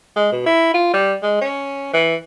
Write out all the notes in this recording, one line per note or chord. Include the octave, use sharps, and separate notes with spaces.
G#3
B2
E4
F4
G3
G#3
C#4
E3